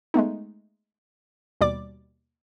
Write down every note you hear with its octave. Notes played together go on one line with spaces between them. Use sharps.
G#3 A3 B3 D#4
D#2 B2 G3 D5 D6